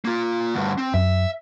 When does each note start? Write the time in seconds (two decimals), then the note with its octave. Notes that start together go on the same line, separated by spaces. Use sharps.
0.05 A#3 F4
0.54 D2 G2
0.78 C4
0.94 F#2 E5